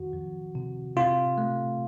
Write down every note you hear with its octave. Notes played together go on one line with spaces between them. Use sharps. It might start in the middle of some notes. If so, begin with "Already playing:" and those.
Already playing: F2 D#3 F#4
F2
C3
C3 F4
A3